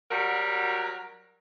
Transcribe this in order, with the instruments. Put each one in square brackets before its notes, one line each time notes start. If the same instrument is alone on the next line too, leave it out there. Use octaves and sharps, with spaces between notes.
[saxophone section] F#3 G3 F#4 A#4